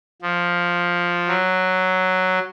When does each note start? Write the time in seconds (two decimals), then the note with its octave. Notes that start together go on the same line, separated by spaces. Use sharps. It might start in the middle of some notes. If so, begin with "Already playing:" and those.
0.22 F3
1.28 F#3